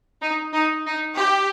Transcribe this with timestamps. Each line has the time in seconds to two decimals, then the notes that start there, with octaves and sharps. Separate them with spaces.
0.21 D#4
0.53 D#4
0.86 D#4
1.17 G4